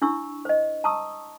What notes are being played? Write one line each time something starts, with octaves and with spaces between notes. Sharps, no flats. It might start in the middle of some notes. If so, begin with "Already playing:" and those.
D4 E4 C#6 E6
C5 D#5
A5 A#5 C#6 D#6 E6